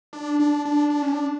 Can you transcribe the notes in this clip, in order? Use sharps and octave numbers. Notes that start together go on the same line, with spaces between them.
D4
D4
D4
D4
C#4
D4